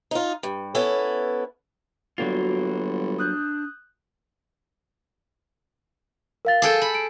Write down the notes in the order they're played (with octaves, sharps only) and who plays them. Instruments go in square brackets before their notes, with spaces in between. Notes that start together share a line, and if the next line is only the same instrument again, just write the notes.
[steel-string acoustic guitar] D#4 F4
G2
B3 C#4 E4 A4
[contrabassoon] G1 [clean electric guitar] F#3 A#3 F4 [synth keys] G3 F#4
[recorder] D4 [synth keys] D#6 F#6 G6
[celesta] A#4 F5 A6
[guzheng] G#4 A4 G5
B5
[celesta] D7